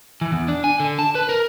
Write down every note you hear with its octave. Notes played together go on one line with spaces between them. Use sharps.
E3
E2
D4
G#5
D3
A5
B4
A#4